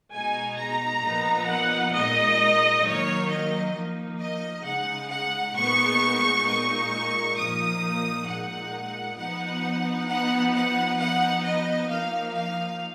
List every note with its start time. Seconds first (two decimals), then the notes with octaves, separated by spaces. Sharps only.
0.12 B2 G#3 D#4 G#5
0.57 A#5
1.03 A#2 F3 B3 D#4
1.48 F#5
1.93 A#2 G#3 D#4 D#5
2.84 D#3 F#3 A#3 D#4 C#5
3.29 D#5
3.75 F3 A#3 D#4
4.20 D#5
4.65 C#3 G#3 D#4 F#5
5.10 F#5
5.55 A#2 G#3 B3 D#4 C#6
6.45 A#2 G#3 D#4 C#6
7.36 A#2 F3 A#3 D#4 D#6
8.27 A#2 G#3 D#4 F#5
9.17 F3 B3 D#4 F#5
10.07 F3 B3 D#4 F#5
10.53 F#5
10.98 F3 B3 D#4 F#5
11.43 D#5
11.88 F3 A#3 D#4 F5
12.34 F5